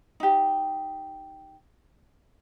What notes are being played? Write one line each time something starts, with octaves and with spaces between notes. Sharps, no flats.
D#4 G4